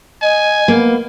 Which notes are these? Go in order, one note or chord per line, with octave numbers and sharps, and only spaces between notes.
D#5 G#5
A#3 B3